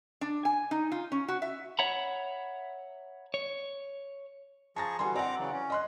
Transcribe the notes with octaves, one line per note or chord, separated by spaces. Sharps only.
D4
G#5
D#4
F4
C#4
F#4
E5
C#5 E5 F#5 A#5 B5
C#5
F3 G#4 A5 A#5 C#6 A6
D3 E3 G3 F#4 G#5 C6
C4 D5 F#5 A#5 D6
C#3 E3 F#3
C#4
D#5 C6 F#6